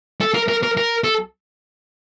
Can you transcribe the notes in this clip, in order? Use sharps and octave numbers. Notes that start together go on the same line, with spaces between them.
A4
A#4
A#4
A#4
A#4
A4